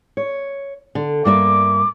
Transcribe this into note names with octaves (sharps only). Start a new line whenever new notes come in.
C#5
D3
G2 A#3 E5 D6